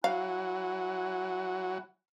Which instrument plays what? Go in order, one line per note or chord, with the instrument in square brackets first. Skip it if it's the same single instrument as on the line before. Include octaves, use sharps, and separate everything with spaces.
[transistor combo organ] F#3 [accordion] E4 G#5 F#6 [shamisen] F5